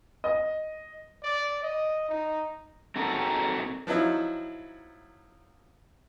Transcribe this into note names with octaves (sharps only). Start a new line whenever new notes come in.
D#5
D5
D#5
D#4
C4 D#4 F#4 A4 A#4
F3 F#3 D#4 E4